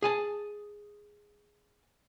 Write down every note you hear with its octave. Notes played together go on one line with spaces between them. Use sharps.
G#4 G#5 A5